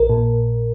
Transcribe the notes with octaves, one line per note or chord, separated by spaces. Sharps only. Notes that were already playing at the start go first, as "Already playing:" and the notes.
Already playing: A#1 A#4
A#2